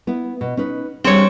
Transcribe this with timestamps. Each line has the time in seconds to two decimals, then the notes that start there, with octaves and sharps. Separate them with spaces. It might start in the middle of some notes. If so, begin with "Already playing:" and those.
0.07 B3 E4
0.41 B2
0.57 C#4 D#4 B4
1.04 G3 C4 D4 G#4 C#5